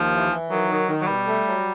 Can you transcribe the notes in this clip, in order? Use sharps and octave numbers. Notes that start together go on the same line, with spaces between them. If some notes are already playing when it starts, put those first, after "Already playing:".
Already playing: D#2 F3
E3
E3
D#3 F#3
D#3
D#3
F#3
B2 G3
A3
F#3